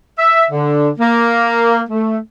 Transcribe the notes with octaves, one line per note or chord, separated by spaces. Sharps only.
E5
D3
A#3
A3